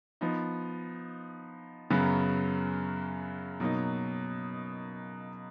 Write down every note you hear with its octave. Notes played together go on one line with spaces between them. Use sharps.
F3 B3 D#4
F#2 C#3 F#3 B3
B2 F#3 A#3 D#4